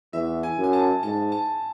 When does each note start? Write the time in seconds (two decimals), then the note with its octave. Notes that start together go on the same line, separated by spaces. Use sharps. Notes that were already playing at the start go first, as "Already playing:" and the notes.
0.13 E2 E5
0.43 G#5
0.58 F#2
0.64 G#5
0.73 A5
1.03 G#2 A5
1.32 A5